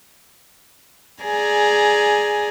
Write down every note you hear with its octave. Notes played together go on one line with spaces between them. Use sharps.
G#4 D5 G#5 A#5